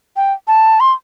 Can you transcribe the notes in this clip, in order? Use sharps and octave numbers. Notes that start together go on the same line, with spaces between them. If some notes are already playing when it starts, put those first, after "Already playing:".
G5
A5
C6